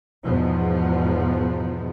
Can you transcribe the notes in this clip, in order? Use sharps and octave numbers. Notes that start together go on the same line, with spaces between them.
E2 G#2 B2 F3 B3